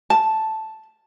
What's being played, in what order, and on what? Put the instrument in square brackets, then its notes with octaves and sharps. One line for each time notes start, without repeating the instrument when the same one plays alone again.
[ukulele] A5